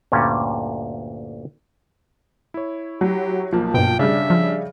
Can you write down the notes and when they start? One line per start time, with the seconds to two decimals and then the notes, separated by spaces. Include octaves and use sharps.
0.12 D2 G2 A#2 G3 C#4
2.54 E4 C#5
3.01 F#3 G4
3.52 B1 F3 A#3
3.74 G2 B2 G5
3.99 C#3 G3 D4 E5
4.30 F3